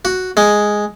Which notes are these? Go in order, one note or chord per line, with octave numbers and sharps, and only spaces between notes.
F#4
G#3